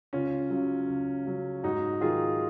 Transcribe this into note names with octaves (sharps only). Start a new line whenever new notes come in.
C#2 C#4 F4
C#3 F#3
C#2
C#3 F#3
G#2 D#4 F#4
D#3 F#3 F4 G#4